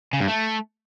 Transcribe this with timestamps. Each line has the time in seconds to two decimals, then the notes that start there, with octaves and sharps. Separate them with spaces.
0.13 C#3
0.20 G2
0.28 A3